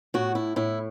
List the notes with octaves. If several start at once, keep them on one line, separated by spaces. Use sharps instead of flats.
A2 F#4
E4
A2 E4